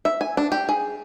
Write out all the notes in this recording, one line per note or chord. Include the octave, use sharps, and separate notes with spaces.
E5
G#5
D4
G4
G#4